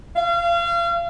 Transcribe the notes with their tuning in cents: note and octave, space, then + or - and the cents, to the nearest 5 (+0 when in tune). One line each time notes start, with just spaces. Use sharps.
F5 -35